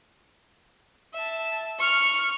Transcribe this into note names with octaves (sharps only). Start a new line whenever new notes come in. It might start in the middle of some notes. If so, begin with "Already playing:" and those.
E5 A5
C#6 F6